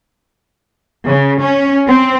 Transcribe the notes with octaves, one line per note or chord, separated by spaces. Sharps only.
C#3
C#4
C4